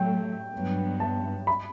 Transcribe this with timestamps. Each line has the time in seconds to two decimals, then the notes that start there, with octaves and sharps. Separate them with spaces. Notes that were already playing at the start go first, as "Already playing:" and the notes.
Already playing: A2 F#3 A3 G5
0.53 G2 F#3 B3
1.00 A5
1.47 B5